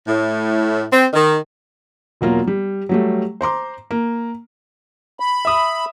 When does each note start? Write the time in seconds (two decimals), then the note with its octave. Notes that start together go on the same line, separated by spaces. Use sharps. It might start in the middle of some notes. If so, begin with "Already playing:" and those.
0.07 A2
0.92 C4
1.14 D#3
2.21 E1 F#3 A#3 F4
2.47 G3
2.89 F#3 G3 A3
3.41 C5 A#5 C6 D6
3.91 A#3
5.20 B5
5.45 E5 D#6